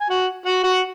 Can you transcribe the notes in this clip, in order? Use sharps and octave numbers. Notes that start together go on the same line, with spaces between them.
G#5
F#4 F#5
F#4 F#5
F#4 F#5